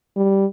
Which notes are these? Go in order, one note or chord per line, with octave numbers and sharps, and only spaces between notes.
G3